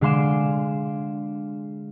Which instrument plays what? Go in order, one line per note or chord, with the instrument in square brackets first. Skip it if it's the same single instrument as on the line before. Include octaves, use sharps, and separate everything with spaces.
[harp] D3 G#3 F5 C6 D6 E7